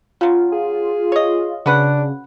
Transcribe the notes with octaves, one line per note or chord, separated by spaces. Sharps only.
C#3 F#3 F4
G#4
C#5 D#5
C#3 D4 F#4 B4 F#5